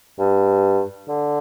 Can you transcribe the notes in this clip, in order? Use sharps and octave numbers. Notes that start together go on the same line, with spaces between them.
G2
D3